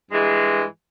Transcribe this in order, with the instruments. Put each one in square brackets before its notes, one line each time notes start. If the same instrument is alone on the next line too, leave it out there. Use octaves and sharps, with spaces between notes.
[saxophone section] G2 E3 G#3